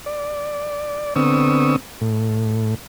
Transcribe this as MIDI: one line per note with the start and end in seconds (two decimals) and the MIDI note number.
0.06 1.14 74
1.16 1.76 50
1.16 1.76 59
1.16 1.76 60
1.16 1.76 85
1.16 1.76 87
1.16 1.76 88
2.01 2.74 45